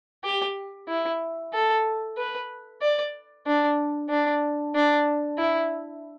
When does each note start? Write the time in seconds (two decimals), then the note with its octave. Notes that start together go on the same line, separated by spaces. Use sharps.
0.24 G4
0.88 E4
1.53 A4
2.17 B4
2.81 D5
3.46 D4
4.10 D4
4.75 D4
5.38 E4